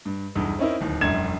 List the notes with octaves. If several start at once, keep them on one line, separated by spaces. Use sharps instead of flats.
G2
B1 E2 G2
C4 C#4 D#4 E4 A#4
D1 D#2
E1 A#1 F#2 D3 G#6 E7